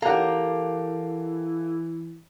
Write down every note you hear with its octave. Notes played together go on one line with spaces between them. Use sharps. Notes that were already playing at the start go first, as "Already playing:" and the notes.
E3 A#3 G4 A4 F5 F#5 A#5